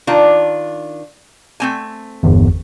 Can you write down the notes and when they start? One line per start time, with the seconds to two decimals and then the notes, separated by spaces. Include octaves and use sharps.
0.07 D#3 D4 F4
1.60 A3 C4 G#5
2.23 G1 E2